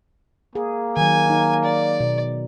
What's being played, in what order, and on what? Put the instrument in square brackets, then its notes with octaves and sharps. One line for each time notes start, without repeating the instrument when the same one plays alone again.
[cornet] A#3 [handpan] G#4
[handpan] D#3 F#3 [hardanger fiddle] G#5
[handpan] D#4
[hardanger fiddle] D5
[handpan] B2